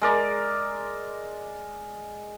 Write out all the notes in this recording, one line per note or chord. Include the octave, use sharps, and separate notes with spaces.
G#3 A#4 D5